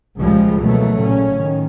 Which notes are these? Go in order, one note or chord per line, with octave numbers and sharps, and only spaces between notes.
C#2 A#2 F3 G3 G#3
B2 E3 F#3 A3 A#3
A#2 C#3 C#4
A2 D#3